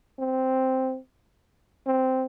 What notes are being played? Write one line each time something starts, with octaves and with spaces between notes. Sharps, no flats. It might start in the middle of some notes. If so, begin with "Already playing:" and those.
C4
C4